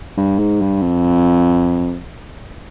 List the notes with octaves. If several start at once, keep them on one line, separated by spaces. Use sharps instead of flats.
G2
G#2
G2
F2